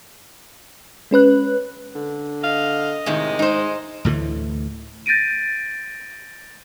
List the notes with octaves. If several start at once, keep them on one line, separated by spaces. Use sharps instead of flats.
G#3 C#4 B4 F#6
D3
D#5 F5
A2 C3 D#3 G#3
G#2 D#4 C5
D2 A2 D3 E3
G6 A6 A#6 D7 D#7